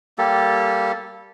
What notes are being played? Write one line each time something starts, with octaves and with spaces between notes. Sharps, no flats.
G3 A#3 G4 A4